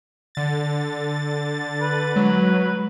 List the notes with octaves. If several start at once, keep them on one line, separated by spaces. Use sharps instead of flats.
D3 A6
B4
F#3 G#3